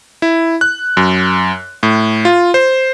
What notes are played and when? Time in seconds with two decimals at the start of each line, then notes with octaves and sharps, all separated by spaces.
0.22 E4
0.61 F#6
0.97 F#2
1.83 A2
2.25 F4
2.54 C5